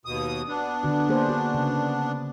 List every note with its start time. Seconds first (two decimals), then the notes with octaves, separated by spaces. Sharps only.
0.05 D#2 B2 D#6
0.48 B3 D4
0.83 D3 F#4
1.09 A#3 G#4 C5
1.29 F#4
1.54 C#3